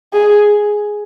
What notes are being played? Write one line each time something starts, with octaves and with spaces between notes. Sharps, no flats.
G#4